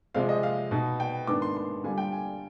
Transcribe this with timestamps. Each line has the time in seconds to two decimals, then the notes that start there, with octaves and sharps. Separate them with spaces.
0.14 C3 F3 G#3 C4 F5
0.29 D#5
0.43 F5
0.71 B2 B3 D#4
1.00 G5
1.27 G#2 D#3 B3 D4 D6
1.42 C6
1.56 C6
1.84 D3 G3 D4 F4 G#5
1.98 G5
2.12 G#5